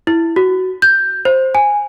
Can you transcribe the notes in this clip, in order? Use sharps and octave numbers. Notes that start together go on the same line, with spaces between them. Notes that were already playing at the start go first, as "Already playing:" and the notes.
E4
F#4
G6
C5
G#5